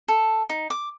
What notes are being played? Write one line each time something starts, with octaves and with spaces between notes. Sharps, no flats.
A4
D#4
D6